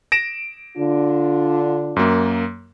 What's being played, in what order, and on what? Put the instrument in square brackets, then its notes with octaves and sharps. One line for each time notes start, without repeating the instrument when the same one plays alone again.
[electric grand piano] A#6 D7 E7
[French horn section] D3 D4 F4
[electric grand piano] F#2 A#3